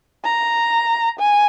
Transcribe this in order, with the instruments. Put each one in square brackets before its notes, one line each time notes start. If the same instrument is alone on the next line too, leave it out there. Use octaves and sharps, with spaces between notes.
[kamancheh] A#5
G#5